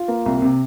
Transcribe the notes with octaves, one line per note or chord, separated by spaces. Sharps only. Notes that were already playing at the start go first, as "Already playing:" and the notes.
Already playing: F4
A#3
C2
C3